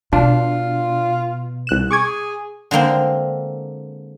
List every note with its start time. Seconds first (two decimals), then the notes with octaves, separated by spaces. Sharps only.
0.13 B2 D4 F4
1.67 C2 F#6 E7
1.91 G#4 C#6 D6 G#6
2.71 D3 G#3 A#3 C4